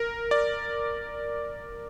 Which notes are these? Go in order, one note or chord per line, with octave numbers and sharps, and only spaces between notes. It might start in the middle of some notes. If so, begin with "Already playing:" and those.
Already playing: A#4
D5